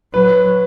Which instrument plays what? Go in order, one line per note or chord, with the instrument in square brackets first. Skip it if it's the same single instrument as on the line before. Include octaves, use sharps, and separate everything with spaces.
[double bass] F#3 [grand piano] B4